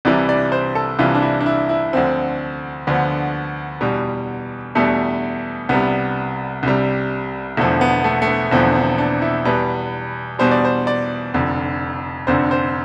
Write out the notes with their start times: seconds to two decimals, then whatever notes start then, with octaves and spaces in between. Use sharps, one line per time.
0.05 C2 C3 E3 G3 D5
0.29 D5
0.52 C5
0.75 A4
0.99 C2 C3 E3 G3 F4
1.15 D4
1.22 E4
1.40 D4
1.46 E4
1.69 E4
1.93 D2 D3 F3 C4
2.87 D2 D3 F3 B3
3.81 E2 B2 G3
4.75 E2 B2 G3 A3
5.69 C2 C3 G3 B3
6.63 C2 C3 G3
7.57 E1 E2 D3 F3 A3
7.81 B3
8.04 A3
8.22 A3
8.28 B3
8.51 E1 E2 D3 F3 C4
8.75 C4
8.98 D4
9.22 E4
9.45 E2 B2 G3 B4
10.39 E2 B2 G3 C5
10.51 D5
10.65 C5
10.87 D5
11.34 F1 F2 D3
12.27 F1 F2 D3 C5
12.51 C5